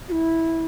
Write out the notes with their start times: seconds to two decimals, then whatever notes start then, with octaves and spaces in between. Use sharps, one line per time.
0.09 F#4
0.12 E4